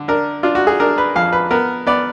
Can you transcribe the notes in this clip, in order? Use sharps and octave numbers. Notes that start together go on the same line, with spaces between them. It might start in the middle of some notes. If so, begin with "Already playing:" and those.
Already playing: D3
D4 A#4
D4 F4
F#4
G#4
D4 A#4
B4
F2 F5
B4
B3 A#4
B3 D5